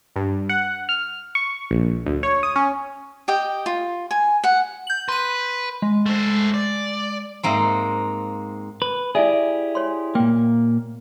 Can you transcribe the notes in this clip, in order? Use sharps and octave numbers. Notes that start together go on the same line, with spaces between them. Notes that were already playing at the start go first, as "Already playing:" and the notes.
G2
F#5
F6
C#6
A#1
D2
C#5
D#6
C#4
G4 D#5 G5
F4
G#5
F#5
G6 F#7
B4 C6 D#7
G#3
A3 C5
D5
G#2 A#3 C4
B4
E4 G4 G#4 D5 E5 G#5
C#5 C6
A#2 A#3 G5